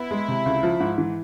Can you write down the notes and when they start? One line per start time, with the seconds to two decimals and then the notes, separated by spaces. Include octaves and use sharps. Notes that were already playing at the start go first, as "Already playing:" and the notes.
Already playing: B3 E4
0.11 G#3
0.28 C3
0.46 C#2
0.63 F3
0.80 G#2
0.98 E3